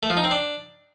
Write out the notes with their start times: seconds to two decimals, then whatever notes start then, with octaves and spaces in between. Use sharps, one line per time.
0.03 A3
0.10 F3
0.17 D#4
0.24 C4
0.31 D4